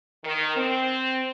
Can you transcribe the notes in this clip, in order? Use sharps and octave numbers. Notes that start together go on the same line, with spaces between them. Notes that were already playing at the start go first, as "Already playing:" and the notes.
D#3
C4